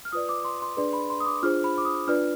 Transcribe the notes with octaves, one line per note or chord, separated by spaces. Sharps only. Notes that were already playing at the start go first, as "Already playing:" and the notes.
F6
F4 B4 D5 D#6
D6
C6
C6
D4 G#4 B4 D5 C6
B5
C6
D#6
D6
D4 F4 G#4 C5 F6
B5
D6
D#6
D4 F4 B4 D5 F6